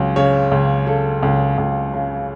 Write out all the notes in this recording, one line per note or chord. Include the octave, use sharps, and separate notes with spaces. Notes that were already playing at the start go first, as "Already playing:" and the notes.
Already playing: C#2 F#3
C#3 C#5
C#2
C#3 A4
C#2
C#2
C#3